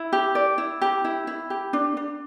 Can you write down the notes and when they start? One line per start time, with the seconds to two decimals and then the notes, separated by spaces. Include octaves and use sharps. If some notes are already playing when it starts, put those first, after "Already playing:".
Already playing: E4
0.13 G4
0.35 D5
0.58 E4
0.82 G4
1.04 E4
1.27 E4
1.50 G4
1.73 D4
1.97 D4